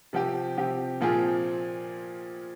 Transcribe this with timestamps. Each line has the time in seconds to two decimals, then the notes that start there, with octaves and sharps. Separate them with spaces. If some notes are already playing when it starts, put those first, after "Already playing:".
0.13 C3 F3 C4 G4
0.57 C3 F3 C4 G4
1.01 A#2 F3 C4 F4 G#4